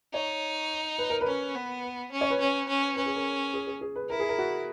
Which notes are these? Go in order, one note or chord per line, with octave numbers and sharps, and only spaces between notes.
D#4 C#5
B4
A#4
B4
C#4
B3
C#4
C#5
B4
C#4
C#4
C#4 B4
G#4
A#4
G#4
G#4
G#4
B4
E4 A#4
G#4
A#4
F#4